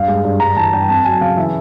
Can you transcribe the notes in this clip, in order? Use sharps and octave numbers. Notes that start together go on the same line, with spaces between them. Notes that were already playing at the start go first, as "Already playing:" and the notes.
Already playing: G2 F5
G#3
G2
G2 A#5
E3 A5
G2 G5
F2 A5
F#3 G#5
C#3 F5
E3 E5